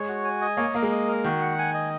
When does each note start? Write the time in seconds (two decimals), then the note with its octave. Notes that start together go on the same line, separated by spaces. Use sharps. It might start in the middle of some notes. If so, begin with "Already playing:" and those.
Already playing: G#3 C#5
0.08 F#4
0.24 G#5
0.41 D#5
0.57 A#3 C#5
0.75 A#3 A#4
0.83 G#3
0.91 D#5
1.07 A#4
1.24 D#3 F#4
1.42 F#5
1.58 G#5
1.74 D#5